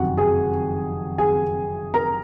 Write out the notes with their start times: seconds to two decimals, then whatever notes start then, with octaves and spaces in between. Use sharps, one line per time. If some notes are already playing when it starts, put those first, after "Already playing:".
Already playing: F#1 F2 C3 D#3 F#4 F#5
0.17 G#4 G#5
1.18 G#4 G#5
1.94 A#4 A#5